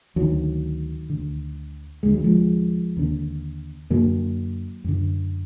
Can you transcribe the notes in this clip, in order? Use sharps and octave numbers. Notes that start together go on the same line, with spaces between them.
D2 D3 D#3 F#3
D2 D3
D#2 D3 G#3
F#3
F3 G#3
D#2 D3
F#2 D3 F#3 A#3
F#2 D3